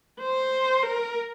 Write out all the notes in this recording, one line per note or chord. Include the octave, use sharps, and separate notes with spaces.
C5
A#4